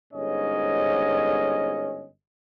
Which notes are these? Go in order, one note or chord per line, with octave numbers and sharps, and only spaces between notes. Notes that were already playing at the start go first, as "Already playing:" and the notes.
G1 G#2 C#4 C#5 D#5